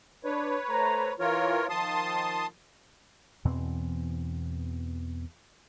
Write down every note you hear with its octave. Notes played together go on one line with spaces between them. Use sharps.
D4 B4 C#5
A3 C5 A#5
E3 F4 A#4 C#5
D#3 F3 A5 C6 D#6
E2 B2 E3 C4